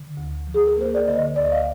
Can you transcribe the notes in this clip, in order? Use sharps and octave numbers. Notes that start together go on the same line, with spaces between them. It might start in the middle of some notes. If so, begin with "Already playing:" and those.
Already playing: D3
D2
F3
G#4
A#4
A#3 C5
D5
D3 D#5
D2 D5
D#5
F5